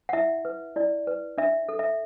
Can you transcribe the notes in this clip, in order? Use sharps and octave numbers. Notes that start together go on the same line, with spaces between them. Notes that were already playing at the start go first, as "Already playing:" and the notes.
F#5
E4 E5
B4
E4 D5
B4
D4 E5
A4
E5